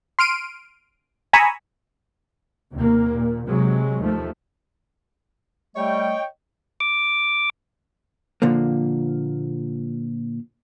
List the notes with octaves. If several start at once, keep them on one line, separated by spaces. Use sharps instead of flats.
C6 F6 D7 D#7
G#5 A#5 B5 C#6 D#6 E6
D#2 C3 A#3
A#2
C3 F#3 G#3
D#2 F3 A3
G3 A3 C#5 D#5 G5
D6
A#2 D3 F3 A#3